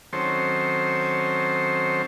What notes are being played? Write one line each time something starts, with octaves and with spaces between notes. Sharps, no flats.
D#3 F#3 C4 C#4 A4 C5